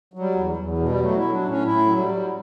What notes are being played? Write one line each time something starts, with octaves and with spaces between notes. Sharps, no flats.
F#3
G3
E2
E2
B2
G3
F#3 A3
F#4
E4
F#3
D4
A2 C#4
A2 E4
F#3
G3
F#3